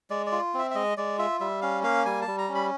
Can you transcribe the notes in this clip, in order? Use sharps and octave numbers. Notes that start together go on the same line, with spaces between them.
G#3 D5
D5
F4
C4 E5
E5
G#3 D#5
G#3 D5
F4 E5
G3 E5
C#4 F5
A#3 F5
G3 G#5
A5
G3
A#5
C#4
B5